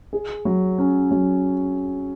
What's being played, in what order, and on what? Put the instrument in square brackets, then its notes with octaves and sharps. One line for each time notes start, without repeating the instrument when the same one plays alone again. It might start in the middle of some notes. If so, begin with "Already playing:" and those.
[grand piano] G#4
F#3
C#4
F#3